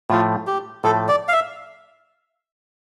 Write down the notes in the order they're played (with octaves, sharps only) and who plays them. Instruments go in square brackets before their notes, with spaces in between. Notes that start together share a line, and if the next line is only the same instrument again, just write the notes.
[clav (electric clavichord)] A2 F3 A3 [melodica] F4
[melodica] G4
[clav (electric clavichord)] A2 F3 A3 [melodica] A4
[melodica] D5
F5
E5